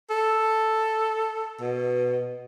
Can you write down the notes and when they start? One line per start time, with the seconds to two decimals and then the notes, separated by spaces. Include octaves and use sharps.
0.10 A4
1.61 B2